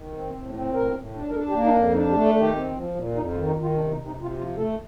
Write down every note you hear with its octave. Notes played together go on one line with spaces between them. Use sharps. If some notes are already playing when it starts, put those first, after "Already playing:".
Already playing: D#3
C4
A2
C4
A2 A#4
A2
D4
A#4
D4 A4
G4
A#3
D#4
F2 D4
D4 D#4
G4
A3
A4
D#3 G4
C4
F3
A#2
F2 D#4
F4
D#3
D#4
D#3
F4
C3 D4
D#4
C3
D#4
C3
F4
F3 F4
A3 A4